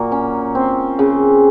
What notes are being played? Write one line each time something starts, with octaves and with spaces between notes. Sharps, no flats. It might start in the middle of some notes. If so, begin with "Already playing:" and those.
Already playing: A#2 F#3 A#3
C#4
C4
C#3